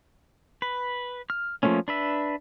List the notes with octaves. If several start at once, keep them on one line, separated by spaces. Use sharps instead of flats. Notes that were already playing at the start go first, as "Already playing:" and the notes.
B4
F6
F3 F#3 A3 A#3 C#4
D4 B4 E5